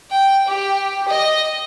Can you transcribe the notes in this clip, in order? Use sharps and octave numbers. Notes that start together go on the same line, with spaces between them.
G5
G4
D#5